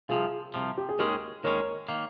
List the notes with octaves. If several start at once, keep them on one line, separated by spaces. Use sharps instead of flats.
C2 C3 F3 F4 G#4
C2 C3 F3
G4
G#4
D#2 D#3 G#3 C#4 G4 A#4
D#2 D#3 G#3 C#4 A#4 C#5
D#3 A#3